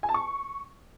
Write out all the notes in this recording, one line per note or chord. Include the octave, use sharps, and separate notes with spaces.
G#5
A5
C#6